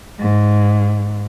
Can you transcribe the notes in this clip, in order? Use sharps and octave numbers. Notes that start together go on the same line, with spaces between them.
G#2